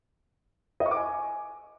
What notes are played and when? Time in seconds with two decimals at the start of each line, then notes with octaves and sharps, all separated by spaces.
0.80 D#5
0.86 C#6
0.91 D6
0.97 G#5